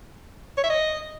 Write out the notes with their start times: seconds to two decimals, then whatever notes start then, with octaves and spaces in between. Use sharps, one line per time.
0.57 C#5
0.64 E5
0.70 D#5